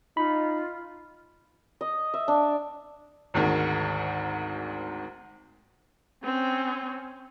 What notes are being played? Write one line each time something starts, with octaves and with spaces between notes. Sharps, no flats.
D#4 F4 B5
D#5
E5
D4
G#1 D2 G#2 D#3
C4 C#4